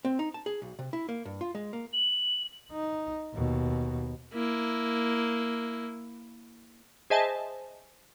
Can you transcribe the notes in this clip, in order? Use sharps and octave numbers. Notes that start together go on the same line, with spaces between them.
C4
D#4
A5
G#4
B1
C3
E4
A#3
G2
F4
G#3
A#3
F#7
D#4
D#2 B2
A#3 E4
G#4 C5 D#5 E5 G#5 A5